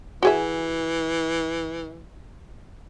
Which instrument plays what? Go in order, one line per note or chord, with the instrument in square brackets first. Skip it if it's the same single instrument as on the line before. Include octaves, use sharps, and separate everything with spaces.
[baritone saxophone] E3 [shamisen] F#4 G#4 E5